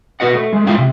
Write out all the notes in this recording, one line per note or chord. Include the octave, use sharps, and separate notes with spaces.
B2 A#3 F#4 B4 D#5 F#5
A3
G#3 A3
G#3 E4 F4 E5 G5
C3